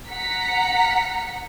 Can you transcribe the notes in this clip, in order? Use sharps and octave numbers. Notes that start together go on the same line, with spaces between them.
F#5 A#5 B6 C#7